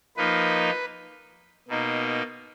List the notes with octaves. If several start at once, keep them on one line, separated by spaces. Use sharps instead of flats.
F3 A#3 D#4 B4
B2 A#3 D#4